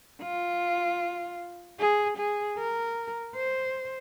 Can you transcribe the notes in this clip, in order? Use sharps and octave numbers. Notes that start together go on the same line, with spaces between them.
F4
G#4
G#4
A#4
C5